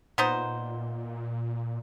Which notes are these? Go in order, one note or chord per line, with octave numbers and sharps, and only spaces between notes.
A#2 B3 D#4 C5